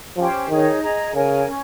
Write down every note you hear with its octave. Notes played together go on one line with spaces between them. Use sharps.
F3 C#4 G4 C5 G5
D#3 D#4 G#4 C#5
G#4 D#5 A#5
C#3 A#4 C#5 G#5
C#4